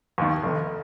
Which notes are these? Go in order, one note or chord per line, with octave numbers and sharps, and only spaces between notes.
D#2 D#3
F1